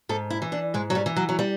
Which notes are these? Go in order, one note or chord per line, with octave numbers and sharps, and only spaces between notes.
G#2 A4
E4
E3
D4
G#2 G#3
F#3
G3
E3
F#3
F#3
G3